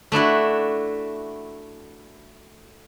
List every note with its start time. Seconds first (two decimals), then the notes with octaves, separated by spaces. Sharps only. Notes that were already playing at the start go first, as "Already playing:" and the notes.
0.12 A3 D4 E4 F#4